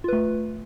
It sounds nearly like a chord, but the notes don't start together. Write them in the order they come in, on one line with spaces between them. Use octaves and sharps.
F4 B4 A3